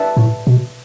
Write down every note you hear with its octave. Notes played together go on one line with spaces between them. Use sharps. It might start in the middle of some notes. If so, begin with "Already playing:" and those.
Already playing: D4 B4 E5 A5
A2
B2